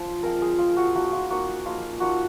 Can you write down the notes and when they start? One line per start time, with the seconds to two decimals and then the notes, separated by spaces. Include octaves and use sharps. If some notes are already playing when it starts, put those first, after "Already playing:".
Already playing: F3 C5
0.23 F3 G#3 C4 A#4
0.42 G#4
0.58 F3 G#3 C4 F4
0.77 F#4
0.95 F3 A#3 D#4 F#4
1.12 F4
1.29 F3 A#3 D#4 F#4
1.65 F3 A#3 D#4 F4
2.00 F3 A#3 D#4 F#4